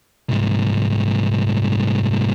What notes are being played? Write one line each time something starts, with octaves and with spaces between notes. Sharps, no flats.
C2 G#2